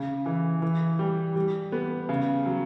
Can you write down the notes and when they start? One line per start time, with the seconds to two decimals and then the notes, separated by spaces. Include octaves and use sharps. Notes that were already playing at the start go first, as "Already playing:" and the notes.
Already playing: C#3
0.26 E3
0.62 E3
0.99 G3
1.36 G3
1.72 B3
2.09 C#3
2.46 F#3